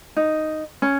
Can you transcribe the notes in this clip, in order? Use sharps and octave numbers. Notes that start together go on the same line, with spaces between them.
D#4
C#4